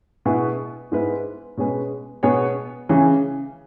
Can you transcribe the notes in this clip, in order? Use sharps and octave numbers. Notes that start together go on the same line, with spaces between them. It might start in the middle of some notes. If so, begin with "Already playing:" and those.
B2 B3 E4 G#4 B4
G#2 G#3 B3 E4 B4
B2 G#3 C#4 G#4 B4
B2 B3 G#4 C#5
C#3 E3 C#4 G#4